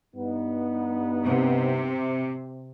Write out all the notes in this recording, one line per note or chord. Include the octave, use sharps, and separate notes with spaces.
G2 B3 D#4
C3